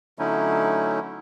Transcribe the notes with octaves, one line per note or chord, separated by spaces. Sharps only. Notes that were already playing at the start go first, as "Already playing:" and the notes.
D3 F#3 A3 C#4 D#4 E4